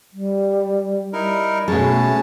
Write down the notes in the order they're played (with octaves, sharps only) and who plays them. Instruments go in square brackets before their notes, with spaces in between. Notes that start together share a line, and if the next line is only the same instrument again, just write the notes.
[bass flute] G3
[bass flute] G3 [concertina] D#4 E4 A#4
[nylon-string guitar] B2 G#3 [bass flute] A3 [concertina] C#4 A5